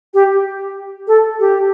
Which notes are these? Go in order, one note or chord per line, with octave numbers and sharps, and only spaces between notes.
G4
A4
G4